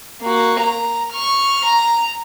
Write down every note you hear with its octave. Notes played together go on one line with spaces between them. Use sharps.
A#3 F#4
A#5
C#6 F6
A#5